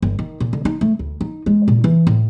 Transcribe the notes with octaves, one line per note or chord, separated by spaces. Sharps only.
G1
D#3
A#2
D3
D#4
A3
D2
D#4
G#3
A#2
E3
A2